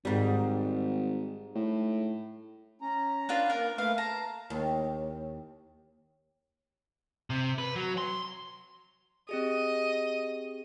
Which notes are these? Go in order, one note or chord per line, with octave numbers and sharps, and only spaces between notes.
G#1 G#2 G3
A2
C#4 A#5
D4 F4 B4
A#3 A#4
A3 A#3 B4 F5
A5 A#5
D#2
C3
B4
F#3
C6
C4 G4 G#4 D#5